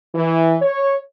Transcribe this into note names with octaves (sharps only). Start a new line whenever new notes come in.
E3
C#5